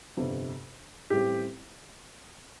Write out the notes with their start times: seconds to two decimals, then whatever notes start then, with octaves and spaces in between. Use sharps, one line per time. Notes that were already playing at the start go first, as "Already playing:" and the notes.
0.17 G1 F2 C3
1.10 A1 A2 G3 C4 G4